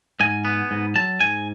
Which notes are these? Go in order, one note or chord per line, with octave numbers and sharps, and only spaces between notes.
G#2 G#5
B3
G#2
F#3 A5
G#2 G#5